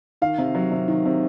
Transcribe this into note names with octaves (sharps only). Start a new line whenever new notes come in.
D#3 F5
C3
F#3
C3
D#3
C3